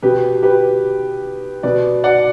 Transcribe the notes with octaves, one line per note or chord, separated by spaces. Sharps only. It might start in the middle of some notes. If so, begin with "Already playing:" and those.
B2 G4 B4
G4 B4
B2 B4 D5
D5 F#5